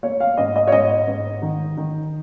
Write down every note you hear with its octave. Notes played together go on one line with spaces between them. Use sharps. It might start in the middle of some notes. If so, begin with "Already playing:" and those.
A#3 C#5
F5
G#2 D#5
D#5
C#5
G#2 D#5
G#2
D#3
D#3